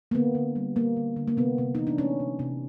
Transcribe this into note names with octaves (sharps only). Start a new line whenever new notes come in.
A#3
D3 B3
D3
G3
A#3
D3
D3
A#3
C3 B3
C3
E3 D#4
D4
A3 C#4
C3
C3